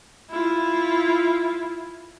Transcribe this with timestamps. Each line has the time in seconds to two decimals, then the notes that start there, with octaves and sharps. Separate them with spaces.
0.30 E4 F4